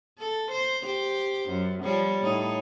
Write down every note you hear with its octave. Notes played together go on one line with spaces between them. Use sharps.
A4
C5
G4 C5
F#2
F3 G3 C#5
A2 D#4 C#5